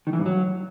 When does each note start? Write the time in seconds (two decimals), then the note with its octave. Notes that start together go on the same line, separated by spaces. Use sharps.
0.07 D#3
0.13 E3
0.19 G2
0.26 F#3